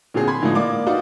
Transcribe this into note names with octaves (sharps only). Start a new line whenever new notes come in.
A#2 D3 F#3 C4 G#4
B5 C6 G#6
A2 D3 F3 G#3 A#3 D#4
A#3 D5 D6
D#4 F4 F#4 B4 D5